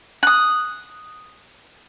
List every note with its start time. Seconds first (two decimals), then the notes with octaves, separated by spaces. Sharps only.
0.23 D#6 F#6